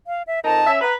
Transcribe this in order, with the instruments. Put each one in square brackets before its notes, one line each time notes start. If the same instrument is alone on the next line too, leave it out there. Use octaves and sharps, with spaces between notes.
[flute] F5
E5
[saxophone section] F2 D#4 A#4 [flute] A5
[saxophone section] C#4 E5
[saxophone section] B4 [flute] A#5